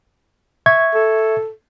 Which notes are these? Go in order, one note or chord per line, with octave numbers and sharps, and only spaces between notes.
E5 C#6 G#6
A4